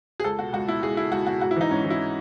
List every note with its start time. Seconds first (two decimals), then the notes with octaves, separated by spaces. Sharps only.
0.20 G#4
0.24 C#2 A4
0.39 B2 F#4
0.53 C#2 F#4
0.68 B2 E4
0.83 C#2 G#4
0.97 B2 E4
1.12 C#2 F#4
1.26 B2 F#4
1.41 G#2 F#4
1.51 E4
1.56 E3 D#4
1.70 G#2 C#4
1.85 E3
1.90 E4